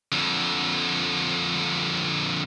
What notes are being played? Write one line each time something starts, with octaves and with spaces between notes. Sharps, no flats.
F2 D3